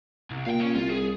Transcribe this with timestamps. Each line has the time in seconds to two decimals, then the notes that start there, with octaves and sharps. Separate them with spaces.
0.31 C2
0.46 A#2 F5 G5
0.60 C#4
0.75 C2 F4
0.90 G#4